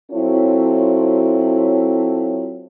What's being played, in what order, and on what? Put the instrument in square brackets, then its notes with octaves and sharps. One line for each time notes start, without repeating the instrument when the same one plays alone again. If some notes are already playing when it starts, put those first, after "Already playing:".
[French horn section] F#3 C4 E4 F4 A4 C#5